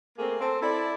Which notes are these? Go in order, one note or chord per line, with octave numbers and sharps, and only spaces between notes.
A3 A#3 C4 G#4
C4 A4
E4 A4 D5